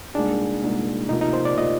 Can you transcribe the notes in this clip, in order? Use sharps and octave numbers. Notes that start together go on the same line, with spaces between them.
C2 A#2 G#3 D4 D#4 G#4
C2 A#2 G#3 D#4 G#4
D2 C3 F3 A#3 D#4 F4
D#4
C5
D5
C3 F3 A#3 F4 D#5